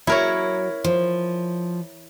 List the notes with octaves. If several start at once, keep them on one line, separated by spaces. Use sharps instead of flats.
F#3 E4 A#4 C#5
F3